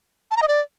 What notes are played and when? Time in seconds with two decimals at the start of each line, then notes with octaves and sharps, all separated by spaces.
0.31 A5
0.37 A#5
0.42 D#5
0.48 D5